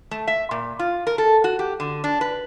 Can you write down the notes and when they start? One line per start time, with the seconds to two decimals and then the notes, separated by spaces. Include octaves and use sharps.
0.11 A3
0.27 E5
0.51 A#2
0.79 F4
1.07 A#4
1.18 A4
1.44 F#4
1.59 G4
1.80 D3
2.04 D4
2.21 B4